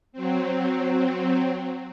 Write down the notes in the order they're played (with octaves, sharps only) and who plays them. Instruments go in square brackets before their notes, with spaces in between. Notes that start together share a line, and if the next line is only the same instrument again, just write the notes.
[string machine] F#3 C4